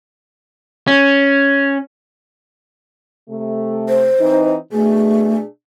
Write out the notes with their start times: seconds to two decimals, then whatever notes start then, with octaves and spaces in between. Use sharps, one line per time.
0.88 C#4
3.29 C3 A3
3.89 C5
4.19 E3 C4 D#4
4.72 B2 A3 D4 G#4